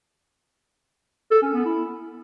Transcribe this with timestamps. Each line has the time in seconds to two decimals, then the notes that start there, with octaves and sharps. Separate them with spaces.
1.31 A4
1.43 C#4
1.54 B3
1.65 E4